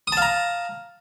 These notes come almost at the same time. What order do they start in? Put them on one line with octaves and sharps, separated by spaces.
D#6 A5 F5 A#5